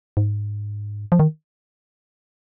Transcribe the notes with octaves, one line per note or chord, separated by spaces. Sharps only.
G#2
F3
D#3